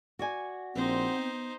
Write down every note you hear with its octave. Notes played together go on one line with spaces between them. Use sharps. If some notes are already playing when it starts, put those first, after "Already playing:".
F#4 D5 G#5
A#1 C4 D#4 C5
B3